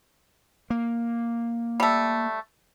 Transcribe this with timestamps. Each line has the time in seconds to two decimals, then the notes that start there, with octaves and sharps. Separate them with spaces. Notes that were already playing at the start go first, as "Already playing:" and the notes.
0.70 A#3
1.80 G3 A3